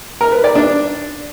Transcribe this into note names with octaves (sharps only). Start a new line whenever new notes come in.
A#4
B4
D5
D4